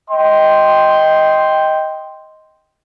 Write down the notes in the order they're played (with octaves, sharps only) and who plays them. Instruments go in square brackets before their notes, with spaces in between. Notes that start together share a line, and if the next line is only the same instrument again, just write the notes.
[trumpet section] D#5 G5 C6